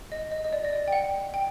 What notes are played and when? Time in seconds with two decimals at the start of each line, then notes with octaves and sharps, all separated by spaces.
0.12 D#5
0.32 D#5
0.45 D#5
0.53 D5
0.65 D#5
0.73 D5
0.88 G5
0.92 F#5
1.34 G5